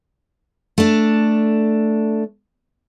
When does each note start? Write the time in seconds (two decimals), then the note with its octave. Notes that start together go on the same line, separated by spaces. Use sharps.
0.78 A3 D4